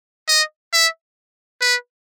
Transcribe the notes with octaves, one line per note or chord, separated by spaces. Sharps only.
D#5
E5
B4